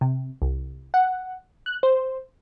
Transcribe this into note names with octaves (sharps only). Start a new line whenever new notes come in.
C3
C2
F#5
F#6
C5